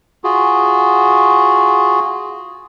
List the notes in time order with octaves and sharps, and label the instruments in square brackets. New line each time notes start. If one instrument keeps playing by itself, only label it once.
[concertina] F4 F#4 G#4